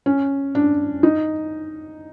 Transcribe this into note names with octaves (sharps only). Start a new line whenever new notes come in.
C#4
D4
D#4